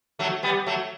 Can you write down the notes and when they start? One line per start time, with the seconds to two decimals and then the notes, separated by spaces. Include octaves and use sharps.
0.19 F#3 A3
0.43 G3 B3
0.66 F#3 A3